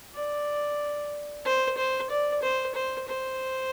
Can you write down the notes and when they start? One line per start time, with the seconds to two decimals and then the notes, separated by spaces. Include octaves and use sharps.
0.15 D5
1.45 C5
1.77 C5
2.10 D5
2.42 C5
2.75 C5
3.07 C5